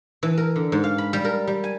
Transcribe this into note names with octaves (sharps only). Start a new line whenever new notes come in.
E3
A#4
D3
G#2
F5
B5
G3
A#4
G3
G#5